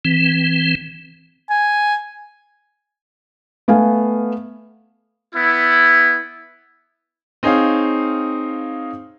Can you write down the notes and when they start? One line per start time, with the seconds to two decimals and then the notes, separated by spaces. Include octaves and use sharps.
0.05 E3 C4
1.50 G#5
3.68 A3 B3 F5 G#5
5.34 B3 E4
7.43 C4 D#4 G#4 C#5 F5